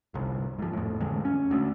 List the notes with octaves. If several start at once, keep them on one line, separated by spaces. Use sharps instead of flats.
G1 C2
G#2 F3
F2 A2
A1 F2 D3 G#3
C#4
D2